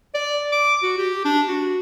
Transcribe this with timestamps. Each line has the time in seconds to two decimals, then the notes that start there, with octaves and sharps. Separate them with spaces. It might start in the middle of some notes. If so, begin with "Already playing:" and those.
0.14 D5
0.52 D6
0.83 F#4
0.98 G4
1.25 D4
1.48 F#4